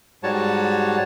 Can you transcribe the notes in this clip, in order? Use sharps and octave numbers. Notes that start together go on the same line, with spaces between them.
G#2 G3 F#4 C#5 A5